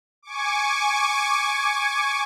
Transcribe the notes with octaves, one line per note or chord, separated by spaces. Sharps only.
G#5 C#6 D6